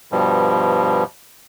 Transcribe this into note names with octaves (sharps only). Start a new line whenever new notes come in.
G2 B2 F3 G3